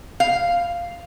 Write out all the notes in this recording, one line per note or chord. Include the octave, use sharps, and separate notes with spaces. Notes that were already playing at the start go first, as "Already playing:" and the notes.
F5